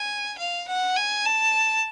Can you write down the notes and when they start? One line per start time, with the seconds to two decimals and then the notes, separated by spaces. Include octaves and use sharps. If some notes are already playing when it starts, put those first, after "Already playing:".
Already playing: G#5
0.38 F5
0.68 F#5
0.96 G#5
1.26 A5